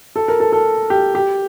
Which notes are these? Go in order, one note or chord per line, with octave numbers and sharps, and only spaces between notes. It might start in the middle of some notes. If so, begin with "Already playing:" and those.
A4
A#4
A4
A4
G4
G4